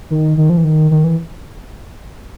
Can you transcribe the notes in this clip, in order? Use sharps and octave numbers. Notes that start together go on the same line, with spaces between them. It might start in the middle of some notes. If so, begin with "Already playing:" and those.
D#3
D#3
F3
E3
D#3
D#3
E3